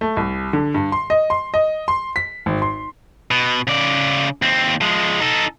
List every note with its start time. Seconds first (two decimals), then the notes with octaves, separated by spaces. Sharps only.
0.01 A3
0.17 C2
0.53 D3
0.74 G2
0.92 C6
1.10 D#5
1.30 C6
1.54 D#5
1.88 C6
2.16 B6
2.46 G#1
2.62 C6
3.31 B2
3.67 C#3 D5
4.42 D#2 C4
4.81 F3 G#3
5.20 D#4 A4